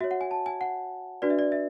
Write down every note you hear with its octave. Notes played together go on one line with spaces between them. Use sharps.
F#4 C#5 E5
F#5
G#5
A5
G#5
F#5
D4 F#4 B4 D5
E5
D5
E5